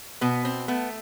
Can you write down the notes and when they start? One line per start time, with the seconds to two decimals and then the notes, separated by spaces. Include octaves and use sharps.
0.21 B2 B3
0.45 C4
0.68 A3 B3